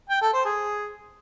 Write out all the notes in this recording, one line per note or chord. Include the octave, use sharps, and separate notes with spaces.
G5
A4
C5
G#4